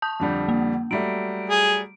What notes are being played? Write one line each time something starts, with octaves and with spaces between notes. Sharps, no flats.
A5 D#6 G6
F2 D3 G3
A#3
F#3 G3 A3 D7
G#4